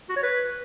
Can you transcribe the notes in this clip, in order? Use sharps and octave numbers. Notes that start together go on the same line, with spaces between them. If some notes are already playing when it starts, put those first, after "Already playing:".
F#4
C#5
B4